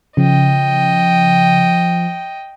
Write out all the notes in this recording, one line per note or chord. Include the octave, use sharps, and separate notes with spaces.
C#3 F3 D#5 G5